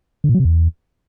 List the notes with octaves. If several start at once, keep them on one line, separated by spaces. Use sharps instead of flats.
D3
A#2
F#3
C3
E2